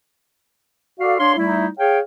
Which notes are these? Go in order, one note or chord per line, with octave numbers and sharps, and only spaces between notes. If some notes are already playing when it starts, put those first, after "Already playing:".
F#4 A4 D5 F5
D4 C#5 F5 C6
G3 A3 D#4 E4
G#4 C#5 F5 G5